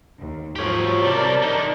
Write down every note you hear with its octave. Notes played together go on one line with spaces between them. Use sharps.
D#2
G#2 F3 F#3 G4 C#5
C3 G3 A#4 D5 A5
D3 D#4